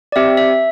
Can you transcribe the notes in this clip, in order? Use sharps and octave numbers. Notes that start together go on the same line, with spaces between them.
D5
C4 G4 E5
E5